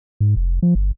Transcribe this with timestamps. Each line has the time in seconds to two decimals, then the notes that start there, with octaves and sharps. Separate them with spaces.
0.20 G#2
0.36 F1
0.62 F3
0.75 G1